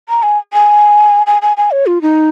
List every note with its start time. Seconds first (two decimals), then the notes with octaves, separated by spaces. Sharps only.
0.09 A#5
0.23 G#5
0.53 G#5
1.27 G#5
1.42 G#5
1.57 G#5
1.71 C#5
1.86 F4
2.02 D#4